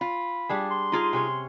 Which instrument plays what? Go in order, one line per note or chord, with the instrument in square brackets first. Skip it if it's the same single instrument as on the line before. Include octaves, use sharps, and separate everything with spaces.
[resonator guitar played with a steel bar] F4 [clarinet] B5
[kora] G3 D4 G#4
[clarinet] C6
[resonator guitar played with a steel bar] D#4 F4 G#4
[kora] C3 C#4 C#5